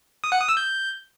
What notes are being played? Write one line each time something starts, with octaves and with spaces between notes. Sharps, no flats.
D#6
F#5
D#6
E6
G6